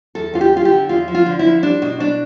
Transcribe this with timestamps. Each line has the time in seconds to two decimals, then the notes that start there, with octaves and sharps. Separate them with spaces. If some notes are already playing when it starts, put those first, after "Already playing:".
0.15 E2 A4
0.34 E2 F4
0.41 G4
0.53 D3 F4
0.65 G4
0.71 D3
0.89 E2 F4
1.08 F3
1.15 F4
1.26 D3
1.39 E4
1.45 F3
1.63 G3 D4
1.82 B2
2.00 B2 D4